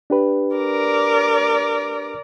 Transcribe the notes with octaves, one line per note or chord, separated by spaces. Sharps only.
D4 G4 B4
A#4 D5